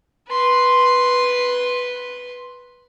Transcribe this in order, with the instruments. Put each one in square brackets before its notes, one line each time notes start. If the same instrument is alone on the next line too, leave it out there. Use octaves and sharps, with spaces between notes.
[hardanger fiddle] B4 C6